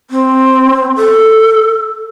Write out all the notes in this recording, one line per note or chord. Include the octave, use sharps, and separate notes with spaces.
C4
A4